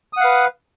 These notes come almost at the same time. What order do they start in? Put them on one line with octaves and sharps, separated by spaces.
D#6 F#5 F5 B4